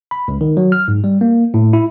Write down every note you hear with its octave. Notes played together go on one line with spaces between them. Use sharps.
B5
C#2
D#3
F#3
F6
G#2
G3
A#3
A2
E4